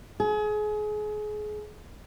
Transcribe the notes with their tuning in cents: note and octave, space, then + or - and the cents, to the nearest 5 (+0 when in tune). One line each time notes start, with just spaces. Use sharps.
G#4 +30